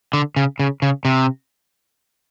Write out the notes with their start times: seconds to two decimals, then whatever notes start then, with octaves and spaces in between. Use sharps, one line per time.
0.13 D3
0.36 C#3
0.59 C#3
0.82 C#3
1.05 C3